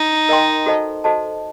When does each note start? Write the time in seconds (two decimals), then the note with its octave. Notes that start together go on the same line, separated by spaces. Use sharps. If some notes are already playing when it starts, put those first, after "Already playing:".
Already playing: D#4
0.29 A#4 D#5 G5 C6
0.66 F#4 A4 C5 D#5 A5
1.04 F#4 A4 C5 D#5 A5